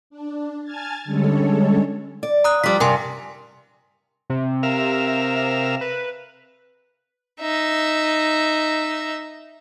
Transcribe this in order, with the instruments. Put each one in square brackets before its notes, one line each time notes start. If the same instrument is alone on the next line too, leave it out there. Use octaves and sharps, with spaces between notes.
[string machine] D4
G#5 A5 F6 G#6 A6
D3 G3 G#3 C#4 A4 C#5
[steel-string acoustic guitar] D5
[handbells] A#5 D#6 F#6
[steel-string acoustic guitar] F3 G3 [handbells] D6 B6
[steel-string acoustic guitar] G2 C3 [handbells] A#4 G#5 C6
[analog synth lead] C3
[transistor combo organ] A#4 E5 F5
[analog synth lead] B4
[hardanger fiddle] D#4 E5